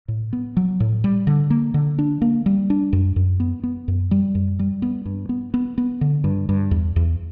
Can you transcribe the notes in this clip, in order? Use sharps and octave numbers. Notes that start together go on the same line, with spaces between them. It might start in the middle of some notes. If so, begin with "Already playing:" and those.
A2
B3
F#3
A2
G3
D3
A#3
D3
D4
A#3
G3
D4
F#2
F#2
B3
B3
F#2
G3
F#2
G3
B3
G2
B3
B3
B3
D3
G2
G2
E2
E2